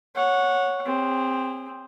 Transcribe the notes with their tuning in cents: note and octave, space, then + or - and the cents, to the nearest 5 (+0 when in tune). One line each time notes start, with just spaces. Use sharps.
C#5 +0 F#5 -15
C4 +0 G#4 -30